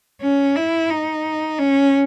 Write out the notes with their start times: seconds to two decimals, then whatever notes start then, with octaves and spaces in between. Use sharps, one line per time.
0.22 C#4
0.56 E4
0.90 D#4
1.58 C#4